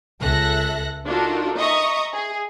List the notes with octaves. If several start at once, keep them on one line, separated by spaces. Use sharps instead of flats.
C#2 A4 E5 F#6 A#6
D4 D#4 F4 F#4 A4 A#4
D#5 E5 A#5 C#6 D#6
G#4